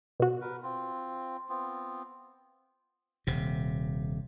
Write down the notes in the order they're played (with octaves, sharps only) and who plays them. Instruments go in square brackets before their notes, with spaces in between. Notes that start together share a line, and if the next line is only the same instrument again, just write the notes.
[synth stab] B2 F#4
[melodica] A#4 B4
C4 F4
B3 C4 F4
[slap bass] D#1 C3